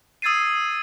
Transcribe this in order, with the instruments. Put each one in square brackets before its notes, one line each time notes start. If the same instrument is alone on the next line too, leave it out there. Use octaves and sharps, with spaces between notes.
[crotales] D#6 E6 G#6 A6 C7 D#7